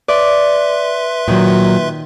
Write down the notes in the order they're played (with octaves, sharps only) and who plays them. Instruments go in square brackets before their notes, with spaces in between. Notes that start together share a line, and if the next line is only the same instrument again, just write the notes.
[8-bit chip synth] B4 E5 C6 [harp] D5
[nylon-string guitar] A#2 F#3 [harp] D#3